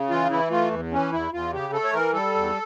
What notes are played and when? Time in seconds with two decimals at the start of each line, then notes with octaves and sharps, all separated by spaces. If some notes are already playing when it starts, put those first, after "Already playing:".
Already playing: C#3
0.10 E3 F4
0.30 E3 E4
0.50 A3 F4
0.71 E2
0.91 E3 C#4
1.12 E2 E4
1.32 E2 F4
1.53 C#3 G4
1.73 A3 A4
1.84 C#5
1.93 E3 A#4
2.13 G3 A4
2.34 E2